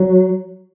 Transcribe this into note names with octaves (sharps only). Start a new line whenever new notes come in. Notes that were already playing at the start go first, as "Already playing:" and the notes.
Already playing: F#3